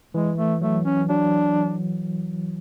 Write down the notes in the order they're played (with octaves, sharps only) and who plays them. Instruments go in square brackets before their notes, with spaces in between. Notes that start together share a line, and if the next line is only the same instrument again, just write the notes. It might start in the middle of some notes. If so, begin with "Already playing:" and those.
[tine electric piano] E3 [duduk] G#3
[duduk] A3
[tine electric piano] F#3 [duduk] A3
[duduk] C#4
[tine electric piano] F#3 [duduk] D4